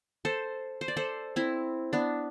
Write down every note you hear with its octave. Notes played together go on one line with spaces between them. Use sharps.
A4 C5
C5
D5
A4 C5
C4 E4
B3 D4